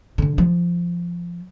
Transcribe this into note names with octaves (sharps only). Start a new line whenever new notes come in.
D3 D4
F3